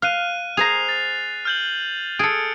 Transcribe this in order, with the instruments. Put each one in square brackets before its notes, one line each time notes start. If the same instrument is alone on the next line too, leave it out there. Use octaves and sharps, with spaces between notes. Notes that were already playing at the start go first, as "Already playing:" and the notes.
[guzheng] F5 [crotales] F6 F#6 D#7
[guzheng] G#4 C5 A#5 [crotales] C7 F7
[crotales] A6
F6 G6 F#7
[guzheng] G#4 A4 [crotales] C#7 D7